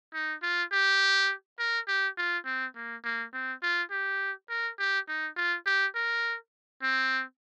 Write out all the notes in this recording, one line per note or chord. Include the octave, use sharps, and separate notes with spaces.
D#4
F4
G4
A#4
G4
F4
C4
A#3
A#3
C4
F4
G4
A#4
G4
D#4
F4
G4
A#4
C4